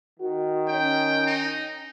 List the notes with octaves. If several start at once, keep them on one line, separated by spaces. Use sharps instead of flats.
D#3 F#4
C#4 G5
D#4